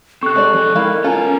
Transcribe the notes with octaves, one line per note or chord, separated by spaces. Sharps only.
C4 G4 A4 C#6 F#6
G#3 D4 D5
F3 G#5
D#3 G#3 E4 A#4 F5
B3 C#4 F4 A4 G#5 A#5